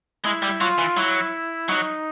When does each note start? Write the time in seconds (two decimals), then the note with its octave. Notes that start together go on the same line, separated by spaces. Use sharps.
0.24 G#3 E4
0.42 G3
0.60 F#3 F4
0.78 E3
0.97 F#3 E4
1.69 F#3 D#4